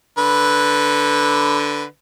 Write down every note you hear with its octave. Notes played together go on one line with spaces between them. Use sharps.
D3 B4